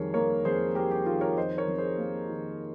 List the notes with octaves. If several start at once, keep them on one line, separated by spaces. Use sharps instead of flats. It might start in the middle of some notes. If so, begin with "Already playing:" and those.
Already playing: F2 D#3 G3 G#4 A#4 C#5
A#3 A#4 C#5
F2 G#4 C5
G3 G4 A#4
G4
D#3 F4 G#4
A#4 C#5
F2 C5 D#5
A#4 C#5
F2
G#4 C5
A#3
D#3